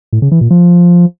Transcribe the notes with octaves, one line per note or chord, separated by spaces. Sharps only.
A2
C#3
E3
A#2
F3